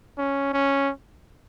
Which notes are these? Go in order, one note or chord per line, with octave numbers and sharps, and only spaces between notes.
C#4
C#4